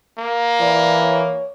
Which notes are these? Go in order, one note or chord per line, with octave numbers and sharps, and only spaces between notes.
A#3
E3 D5
C#5